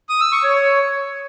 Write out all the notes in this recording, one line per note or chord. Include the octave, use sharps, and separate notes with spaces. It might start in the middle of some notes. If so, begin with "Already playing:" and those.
D#6
E6
C#6
C#5